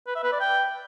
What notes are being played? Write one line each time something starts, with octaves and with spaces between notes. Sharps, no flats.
B4
E5
B4
D5
G5